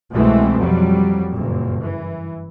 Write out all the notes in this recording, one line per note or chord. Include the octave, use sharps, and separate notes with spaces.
C2 B2 E3 G#3 A3 C4
F2 F#3 G3
F#1 G2 A#2
E3